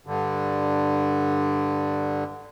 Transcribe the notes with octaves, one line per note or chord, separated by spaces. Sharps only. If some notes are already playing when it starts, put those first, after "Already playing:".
G2 D3